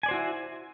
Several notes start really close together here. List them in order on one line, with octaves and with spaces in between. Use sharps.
G#5 D5 C5 F#4 E4